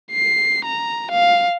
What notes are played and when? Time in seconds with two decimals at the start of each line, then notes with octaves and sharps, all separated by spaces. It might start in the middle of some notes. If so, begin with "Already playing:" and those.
0.11 C7
0.65 A#5
1.12 F5